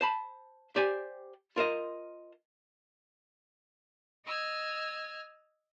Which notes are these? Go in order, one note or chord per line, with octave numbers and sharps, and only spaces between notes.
C5 A5 B5
G4 C5 D5 G5 G#5
F4 A#4 C5 D#5
D#5 E6 F6 G#6